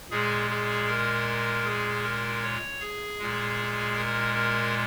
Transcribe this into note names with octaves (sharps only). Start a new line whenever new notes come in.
A#2 G#3 G#4
G#4
A#4
G#4
A#4
C#5
G#4
A#2 G#3
A#4
A#4